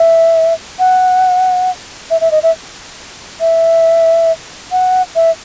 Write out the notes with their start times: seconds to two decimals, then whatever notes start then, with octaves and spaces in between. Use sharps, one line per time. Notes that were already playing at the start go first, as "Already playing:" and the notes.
Already playing: E5
0.79 F#5
2.10 E5
2.21 E5
2.31 D#5
2.43 E5
3.40 E5
4.72 F#5
5.15 E5